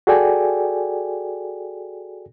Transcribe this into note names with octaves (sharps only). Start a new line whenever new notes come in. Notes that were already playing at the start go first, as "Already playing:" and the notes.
F#4 G#4 A4 D5 G5 G#5